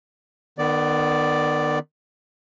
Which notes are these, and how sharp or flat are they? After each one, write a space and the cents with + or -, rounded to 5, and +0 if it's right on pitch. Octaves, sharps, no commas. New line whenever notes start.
D#3 -30 B3 +0 D5 +0